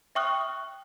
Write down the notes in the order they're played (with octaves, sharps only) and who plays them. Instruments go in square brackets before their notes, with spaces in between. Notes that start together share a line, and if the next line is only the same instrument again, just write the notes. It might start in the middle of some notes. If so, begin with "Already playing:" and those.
[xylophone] E5 G5 C#6 D#6 F6 F#6